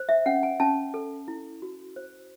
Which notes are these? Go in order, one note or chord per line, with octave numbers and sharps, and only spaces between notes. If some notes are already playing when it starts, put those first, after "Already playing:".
Already playing: C5
E5
C#4 F#5
G#5
C#4 A5
A4
E4
F#4
C5